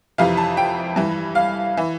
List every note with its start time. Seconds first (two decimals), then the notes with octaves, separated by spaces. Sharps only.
0.18 F2 C3 E3 F5
0.37 A5
0.57 G5
0.96 G2 E3
1.35 F5
1.77 E3